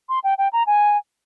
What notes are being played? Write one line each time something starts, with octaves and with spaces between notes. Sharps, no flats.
C6
G5
G5
A#5
G#5